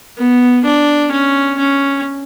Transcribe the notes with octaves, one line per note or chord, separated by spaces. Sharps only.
B3
D4
C#4
C#4